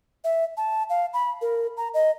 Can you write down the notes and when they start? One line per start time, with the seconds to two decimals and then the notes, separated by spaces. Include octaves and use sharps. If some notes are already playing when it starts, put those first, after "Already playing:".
0.24 E5
0.57 A5
0.90 F5
1.14 B5
1.42 A#4
1.77 A#5
1.94 D#5